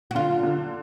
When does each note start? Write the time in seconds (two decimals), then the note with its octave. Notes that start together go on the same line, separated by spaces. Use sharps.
0.11 F#4
0.15 D3 F4
0.43 D3